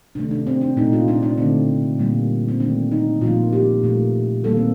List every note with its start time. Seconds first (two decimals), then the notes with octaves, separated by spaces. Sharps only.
0.15 C3 D#3 A3 D4
0.31 D4
0.47 C4
0.61 D4
0.77 A#2 A3 D#4
0.93 F4
1.08 D4
1.23 D4
1.38 D3 A3 C4
1.99 A#2 G3 A#3
2.48 C4
2.60 D#3 A3 D4
2.92 D#4
3.21 A#2 F3 A#3 F4
3.53 G4
3.83 A#2 A3
4.44 D#3 G3 A#3 A4
4.57 C4